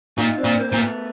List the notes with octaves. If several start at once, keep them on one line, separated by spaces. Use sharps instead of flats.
A#2 D#4 F4
C4 D4
A#2
A#3 C4
A#2 C4
A3 B3